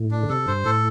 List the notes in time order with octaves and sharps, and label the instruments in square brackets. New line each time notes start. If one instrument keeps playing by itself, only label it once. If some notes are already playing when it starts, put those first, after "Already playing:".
Already playing: [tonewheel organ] A2
[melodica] D4
[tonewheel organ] D3
[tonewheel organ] C3 [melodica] A4
[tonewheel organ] G2 [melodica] C5
[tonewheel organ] A2 [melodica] A4